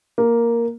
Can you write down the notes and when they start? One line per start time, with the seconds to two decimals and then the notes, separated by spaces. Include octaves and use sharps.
0.18 A#3